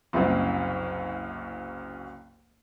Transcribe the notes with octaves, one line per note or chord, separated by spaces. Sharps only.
F#1 C2 F#2